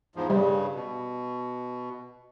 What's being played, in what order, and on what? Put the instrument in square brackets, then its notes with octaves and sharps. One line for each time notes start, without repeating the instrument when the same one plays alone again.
[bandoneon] E2 G#2 F3
[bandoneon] G2 C#3 [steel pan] G3
[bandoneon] B2